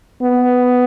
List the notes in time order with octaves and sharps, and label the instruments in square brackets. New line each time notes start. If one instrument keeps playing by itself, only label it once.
[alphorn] B3